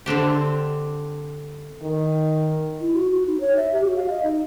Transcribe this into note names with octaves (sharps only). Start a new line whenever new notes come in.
D3 C4 D4 G4
D#3
E4
F#4
F#4
D#4
C#5
E5
G4
F#4
F5
D#5
D#4